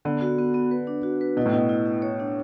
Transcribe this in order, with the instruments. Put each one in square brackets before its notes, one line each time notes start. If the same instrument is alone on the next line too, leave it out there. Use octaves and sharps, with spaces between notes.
[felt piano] D3 [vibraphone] B3
[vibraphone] F#4
B3
B3
B4
D4
F#4
B4
[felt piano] B2 [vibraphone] E4
[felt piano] A2
[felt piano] B2 [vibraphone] E4
[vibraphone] E4
E4
C#5
D4